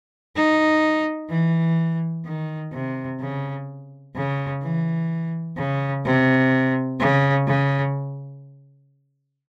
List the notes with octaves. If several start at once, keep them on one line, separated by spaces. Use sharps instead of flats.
D#4
E3
D#3
C3
C#3
C#3
E3
C#3
C3
C#3
C#3